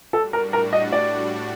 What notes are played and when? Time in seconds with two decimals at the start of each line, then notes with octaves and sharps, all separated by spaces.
0.13 A2 G3 D4 F#4 A4
0.33 A#4
0.53 A#4
0.73 D#5
0.92 D5